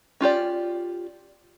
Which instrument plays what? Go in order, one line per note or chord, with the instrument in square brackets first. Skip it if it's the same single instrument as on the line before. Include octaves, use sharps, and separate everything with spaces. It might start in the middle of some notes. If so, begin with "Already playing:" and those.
[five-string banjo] C#4 F4 G4 D5